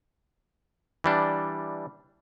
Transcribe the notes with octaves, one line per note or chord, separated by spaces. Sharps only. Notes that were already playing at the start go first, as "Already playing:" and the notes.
E3 G3 D4